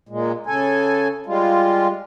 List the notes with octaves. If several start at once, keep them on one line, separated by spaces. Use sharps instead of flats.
A#2 G#3
C#3 A4 G#5
G3 G#3 F4